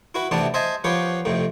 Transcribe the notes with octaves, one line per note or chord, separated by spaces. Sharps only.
E4 F#4 B4
A1 C3 E3 B3 D4 A5
C5 D#5 E5 G#5 A5
F3 B3 G4 B4 C#5
F2 A2 C3